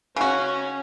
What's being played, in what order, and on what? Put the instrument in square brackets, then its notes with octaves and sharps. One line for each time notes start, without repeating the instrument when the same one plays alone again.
[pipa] C#3 F#4 [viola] C#4